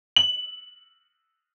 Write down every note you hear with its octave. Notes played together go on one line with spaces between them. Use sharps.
F#7